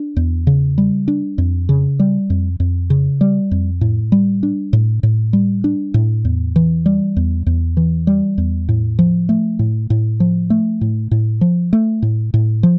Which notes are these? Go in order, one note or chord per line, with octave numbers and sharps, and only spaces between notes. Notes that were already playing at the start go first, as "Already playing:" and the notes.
Already playing: D4
E2
C#3
G3
D4
F2
C#3
G3
F2
F2
C#3
G3
F2
A2
G3
D4
A2
A2
G3
D4
A2
E2
E3
G3
E2
E2
E3
G3
E2
A2
F3
A3
A2
A2
F3
A3
A2
A2
F3
A3
A2
A2
F3